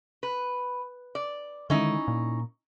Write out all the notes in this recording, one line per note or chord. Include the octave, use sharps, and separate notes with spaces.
B4
D5
D3 D#3 G#3 C#4 D#4 E4
A#2